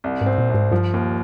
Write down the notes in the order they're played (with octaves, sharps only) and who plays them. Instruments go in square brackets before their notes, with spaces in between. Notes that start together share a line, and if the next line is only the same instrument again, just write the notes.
[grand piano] C2
[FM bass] G#2
[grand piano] C4
[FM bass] A#2
[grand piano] C2 [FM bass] G#2
[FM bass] G2 [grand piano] F3
[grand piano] D#2